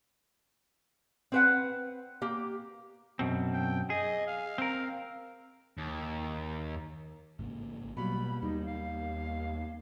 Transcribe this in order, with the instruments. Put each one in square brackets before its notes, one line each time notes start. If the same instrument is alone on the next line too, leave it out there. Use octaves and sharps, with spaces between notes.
[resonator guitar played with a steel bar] C4 B4 F#5
A#3 G4
[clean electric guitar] F#2 B2 C4
[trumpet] G5
[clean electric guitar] G#4 [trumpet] D#5
[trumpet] F5
[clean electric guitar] C4 A#4
[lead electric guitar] D#2
[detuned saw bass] A1 [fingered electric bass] G#2 C#3 A#3
[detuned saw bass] B2 [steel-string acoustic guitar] F#3 G3 F4 [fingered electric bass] A#3 B3 [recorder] B5
[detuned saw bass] D#2 [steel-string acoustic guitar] G3 [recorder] D#4
[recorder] F5